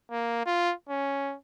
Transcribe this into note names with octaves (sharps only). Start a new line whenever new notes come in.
A#3
F4
C#4